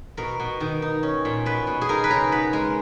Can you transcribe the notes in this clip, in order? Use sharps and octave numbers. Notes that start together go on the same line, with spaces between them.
B2 A#4
B2
D#3
D#4
C#4
A#2
B2 B4
B2
G#4
D#4 A#4
B4
C#3 A#4
B3 B4
G#3 A#4